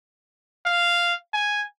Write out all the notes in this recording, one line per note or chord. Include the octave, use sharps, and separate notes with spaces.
F5
G#5